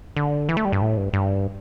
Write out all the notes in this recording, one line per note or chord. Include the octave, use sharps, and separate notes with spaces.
D3
E3
A3
G3
G2
A2
G2
G2